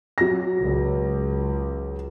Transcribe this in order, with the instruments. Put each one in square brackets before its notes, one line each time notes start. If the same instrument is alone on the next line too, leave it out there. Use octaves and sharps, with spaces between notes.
[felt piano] F#3 A#6
[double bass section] C#2